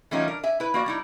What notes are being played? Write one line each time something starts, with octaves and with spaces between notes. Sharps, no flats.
E3 G3 A3 C#4 D#4 F4
D4 A#4
E5 G#5
E4 B4
A#3 F#4 D5
G3 D#4 E4